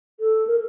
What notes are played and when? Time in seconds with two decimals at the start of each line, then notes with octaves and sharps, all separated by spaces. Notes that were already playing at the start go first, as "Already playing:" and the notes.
0.20 A4
0.47 A#4